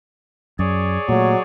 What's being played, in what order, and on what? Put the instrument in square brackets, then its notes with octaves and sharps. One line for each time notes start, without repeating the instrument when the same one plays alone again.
[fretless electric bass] F#2 [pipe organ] G#4 C#5 D5
[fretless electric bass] A#2 A3 [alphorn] F#3